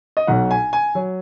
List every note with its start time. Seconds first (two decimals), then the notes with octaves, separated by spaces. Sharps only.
0.17 D#5
0.27 B1 B2 F#3 F#5
0.51 G#5
0.73 G#5
0.95 F#3